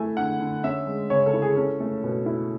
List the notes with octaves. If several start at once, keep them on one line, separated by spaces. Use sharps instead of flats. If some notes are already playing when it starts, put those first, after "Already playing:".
Already playing: A3 E4 G#5
D3 F#5
D3
C#4 E5
G#3
C#3 C#5
A4
E4
G#4
C#4 A4
A3
B2
E4